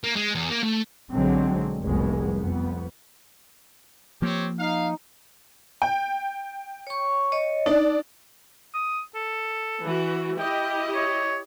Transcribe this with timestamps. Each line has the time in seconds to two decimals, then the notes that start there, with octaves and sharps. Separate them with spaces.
0.04 A#3
0.16 G#3
0.35 E2
0.49 A#3
0.63 A3
1.11 B1 D3 F#3 G#3 C4
1.81 F1 C2 F2 G#3 B3
2.39 F2 B3
4.22 F3 A#3 C4 G4 C#5
4.59 D#4 F5
5.82 G5
6.87 C#5 C#6
7.32 C#5 D#5
7.66 D4 D#4 D5
8.74 D#6
9.15 A4
9.84 E3 F#4
10.38 E4 G4 D#5 G5
10.95 C#5